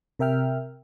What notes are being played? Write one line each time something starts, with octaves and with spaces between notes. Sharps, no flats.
C3 A#4 E5 G5 F6